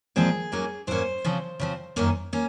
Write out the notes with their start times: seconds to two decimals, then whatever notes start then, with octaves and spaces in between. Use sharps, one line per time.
0.16 A#2 F3 G#3 C4 G#4
0.52 G#2 F#3 A#3 C#4
0.87 G#2 F#3 A#3 C#4 C5
1.24 C#3 F3 C4
1.60 C#3 F3 C4
1.96 F#2 D#3 A#3 C#4
2.33 A#3 C#4